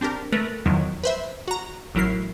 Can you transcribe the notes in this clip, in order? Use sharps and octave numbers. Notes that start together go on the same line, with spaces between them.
C4 D4 G4 A#4
A3 A#4 B4
E2 D#3 F3 F#3
B4 C5 E5
F#4 A#5
A1 F#3 E4 A#4 C7